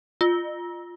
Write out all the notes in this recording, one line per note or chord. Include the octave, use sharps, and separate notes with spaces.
F4